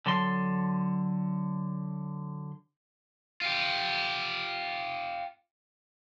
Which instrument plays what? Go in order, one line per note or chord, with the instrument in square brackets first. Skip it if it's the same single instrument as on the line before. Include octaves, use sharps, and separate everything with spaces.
[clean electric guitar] D3 F#3 A4 C6
[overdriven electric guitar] F4 G4